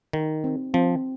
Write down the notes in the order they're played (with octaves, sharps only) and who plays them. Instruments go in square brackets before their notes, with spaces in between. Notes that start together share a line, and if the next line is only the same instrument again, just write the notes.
[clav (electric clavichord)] D#3 [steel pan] D#4
[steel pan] C4
[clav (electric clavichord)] F3 [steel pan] C4